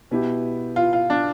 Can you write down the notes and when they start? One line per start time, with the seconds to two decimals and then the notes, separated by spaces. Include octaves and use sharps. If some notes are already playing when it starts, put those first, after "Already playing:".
0.11 B2 B3 E4 G4
0.76 F4
0.93 F4
1.10 D4